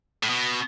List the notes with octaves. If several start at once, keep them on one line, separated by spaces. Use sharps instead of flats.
A2
B2